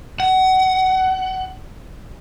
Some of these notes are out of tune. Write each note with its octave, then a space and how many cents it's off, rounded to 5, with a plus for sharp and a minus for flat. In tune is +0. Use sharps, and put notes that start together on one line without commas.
F#5 +25